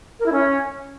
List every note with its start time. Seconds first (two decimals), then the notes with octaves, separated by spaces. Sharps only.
0.20 A#4
0.26 E4
0.32 C#4